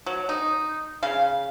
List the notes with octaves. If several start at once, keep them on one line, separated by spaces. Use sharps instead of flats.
F#3
D#4
C#3 F5